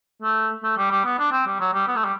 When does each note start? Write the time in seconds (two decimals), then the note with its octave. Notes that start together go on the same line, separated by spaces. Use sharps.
0.22 A3
0.63 A3
0.77 G3
0.91 G3
1.05 B3
1.19 D4
1.32 C4
1.47 G3
1.60 F#3
1.74 G3
1.88 B3
1.96 A3
2.05 G3